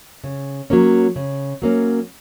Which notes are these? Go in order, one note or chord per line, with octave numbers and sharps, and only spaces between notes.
C#3
F#3 A#3 C#4
C#3
F#3 A#3 C#4